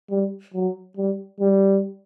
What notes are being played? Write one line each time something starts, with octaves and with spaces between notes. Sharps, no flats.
G3
F#3
G3
G3